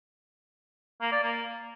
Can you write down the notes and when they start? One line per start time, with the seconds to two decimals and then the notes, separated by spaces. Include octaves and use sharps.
1.01 A#3
1.12 D5
1.23 A#3